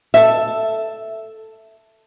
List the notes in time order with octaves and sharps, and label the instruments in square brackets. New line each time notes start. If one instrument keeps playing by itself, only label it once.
[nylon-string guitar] A4 E5